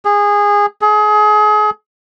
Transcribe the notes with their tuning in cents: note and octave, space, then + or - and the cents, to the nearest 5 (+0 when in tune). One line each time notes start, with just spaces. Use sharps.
G#4 -20
G#4 +30